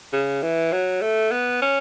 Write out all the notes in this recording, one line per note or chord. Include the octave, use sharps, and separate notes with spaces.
C#3
E3
F#3
A3
B3
C#4